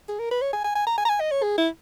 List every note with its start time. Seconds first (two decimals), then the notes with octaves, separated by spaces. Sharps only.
0.09 G#4
0.19 A#4
0.31 B4
0.42 C#5
0.53 G#5
0.64 G#5
0.75 G#5
0.87 A#5
0.98 G#5
1.05 A#5
1.09 G#5
1.20 D#5
1.32 C#5
1.43 G#4
1.58 E4